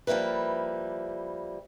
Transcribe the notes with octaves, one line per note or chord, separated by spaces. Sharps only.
F3 G3 A#3 E4 B4